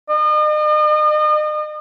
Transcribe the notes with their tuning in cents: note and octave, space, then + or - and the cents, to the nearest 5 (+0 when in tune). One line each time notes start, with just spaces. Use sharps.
D#5 -40